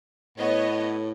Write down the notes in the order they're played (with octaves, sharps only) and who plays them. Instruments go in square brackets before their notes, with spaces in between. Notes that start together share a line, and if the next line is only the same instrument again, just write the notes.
[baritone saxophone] A2 [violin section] B3 C#5 D#5